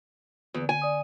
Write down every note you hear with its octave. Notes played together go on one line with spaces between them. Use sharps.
E2 D3
G#5
D5 D#6